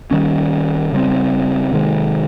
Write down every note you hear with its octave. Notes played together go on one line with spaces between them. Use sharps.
D#3 G3 C#4
C#3 G3 C4
C3 D#3 G#3